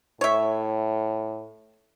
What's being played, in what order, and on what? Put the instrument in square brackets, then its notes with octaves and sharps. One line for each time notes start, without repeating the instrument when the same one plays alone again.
[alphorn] A2 [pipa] C#5 E5